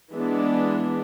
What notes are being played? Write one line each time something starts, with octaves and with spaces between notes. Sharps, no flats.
E3 G#3 B3 D4